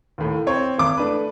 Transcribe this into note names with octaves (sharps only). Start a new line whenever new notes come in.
D#2 A2
C4 C#5
G#1 D6
A3 D4 B4